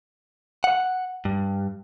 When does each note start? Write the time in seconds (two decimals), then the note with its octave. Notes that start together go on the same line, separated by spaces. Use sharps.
0.64 F#5
1.25 G2